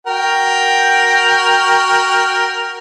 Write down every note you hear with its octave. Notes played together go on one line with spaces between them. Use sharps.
F#4 A#4 G5